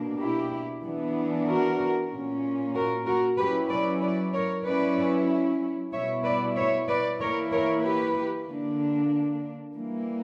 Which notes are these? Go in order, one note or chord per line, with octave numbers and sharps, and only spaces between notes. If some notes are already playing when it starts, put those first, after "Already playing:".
Already playing: B2 A#3 D4
E4 G4
E3 B3 D4
F#4 A#4
A#2 A#3 C#4
F#4 A#4
F#4 A#4
F#3 C#4 E4 G4 B4
B4 D5
B4 D5
A#4 C#5
F#3 C#4 E4 B4 D5
B2 G3 B3 E4 C#5 E5
B4 D5
C#5 E5
B4 D5
E3 A#3 E4 A#4 C#5
A#4 C#5
G4 B4
D3 A#3 D4
E3 G3 A#3